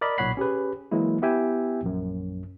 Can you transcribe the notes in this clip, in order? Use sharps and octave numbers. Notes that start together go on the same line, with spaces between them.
A#4 D5 D#5 B5
B1 A#2 C#5 F#5 B5 C7
C#4 G4 G#4 B4
E3 F#3 G#3 A#3 E4
B3 E4 G4 E5 G5 G#5
A#1 F#2